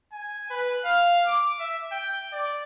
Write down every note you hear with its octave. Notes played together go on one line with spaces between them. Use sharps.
G#5
B4
F5
D6
E5
G5
D5